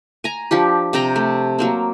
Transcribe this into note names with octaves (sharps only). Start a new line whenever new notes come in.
G#5 A#5
F3 D4 G4
C3 C4 G5 A#5
A3
F#3 A#3 C4